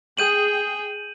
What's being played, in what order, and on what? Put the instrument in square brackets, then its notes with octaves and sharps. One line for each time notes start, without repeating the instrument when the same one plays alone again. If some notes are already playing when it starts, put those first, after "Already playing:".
[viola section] G#4 G5 [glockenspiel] G6 D#7 F#7